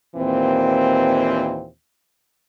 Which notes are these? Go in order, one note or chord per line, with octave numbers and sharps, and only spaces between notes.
D#2 A#2 E3 C4